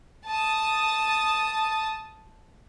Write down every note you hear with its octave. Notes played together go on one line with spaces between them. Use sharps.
A5 D#6